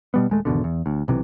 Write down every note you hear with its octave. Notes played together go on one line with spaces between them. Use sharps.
B2 G3 B3
D#1 G#3 A3
G#1 E2 B2 D3
E2
D2
B1 C3 E3